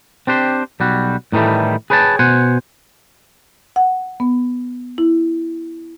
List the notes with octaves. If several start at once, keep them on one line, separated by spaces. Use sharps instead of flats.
C4 D4 G4 C5
B1 G3 F#4
A2 D#3 E3 G3 A3
G#4 B4 C#5 G5 A5
B2 C5 F#5 G#5
F#5
B3
E4